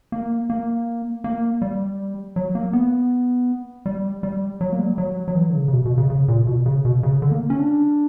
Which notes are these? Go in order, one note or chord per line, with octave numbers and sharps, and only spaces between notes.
A#3
A#3
A#3
G3
F#3
A#3
B3
G3
G3
F#3
A#3
G3
F#3
F#3
E3
D3
C#3
C#3
B2
B2
C#3
C#3
A#2
B2
C#3
B2
C#3
D3
A#3
C#4
D4